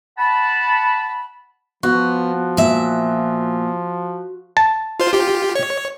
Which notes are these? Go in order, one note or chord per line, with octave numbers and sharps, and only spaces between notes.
F#5 A5 B5
F3 B3 F#4
A#2 E5
A5
F4 C5
F4 G4
C#5